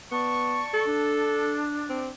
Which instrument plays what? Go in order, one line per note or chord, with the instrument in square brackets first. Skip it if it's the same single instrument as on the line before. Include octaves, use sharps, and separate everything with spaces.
[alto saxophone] B3 [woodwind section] D5 A5 C#6
[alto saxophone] A4
[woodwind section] D4
[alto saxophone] C4